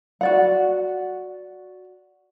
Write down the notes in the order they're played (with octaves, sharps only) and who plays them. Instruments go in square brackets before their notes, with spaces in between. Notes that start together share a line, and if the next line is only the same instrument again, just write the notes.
[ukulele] F#4 D5 F#5